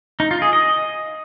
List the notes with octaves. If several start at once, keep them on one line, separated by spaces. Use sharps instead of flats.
D#4
F4
G#4
D#5